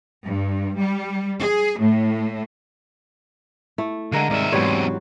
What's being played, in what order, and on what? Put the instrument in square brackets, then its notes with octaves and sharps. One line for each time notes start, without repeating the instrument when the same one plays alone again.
[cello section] G2
G3
G#4
A2
[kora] A3 [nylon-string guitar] E4
[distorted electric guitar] D3 [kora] G#3 A#4 F5
[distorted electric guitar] D#2 E5 [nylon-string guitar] G#2 C3 G3
[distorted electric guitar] E2 C3 [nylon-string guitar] G#2 E3 F#3 [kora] G3 C5 C#5